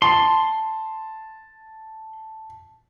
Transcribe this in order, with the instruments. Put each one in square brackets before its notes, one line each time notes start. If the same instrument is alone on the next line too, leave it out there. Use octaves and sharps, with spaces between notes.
[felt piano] A5 [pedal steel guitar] C6